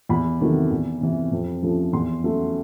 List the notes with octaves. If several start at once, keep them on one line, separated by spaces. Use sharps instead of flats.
E2 B5
C3 D#3 F#3 A3
E2
C3 E3
F2
C#3 F3 A3
E2 C6
C#3 F#3 A3